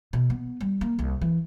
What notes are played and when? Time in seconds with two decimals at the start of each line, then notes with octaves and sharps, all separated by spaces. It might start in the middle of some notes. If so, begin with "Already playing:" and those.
0.13 B2
0.30 B3
0.61 G3
0.81 A#3
0.99 C2
1.22 E3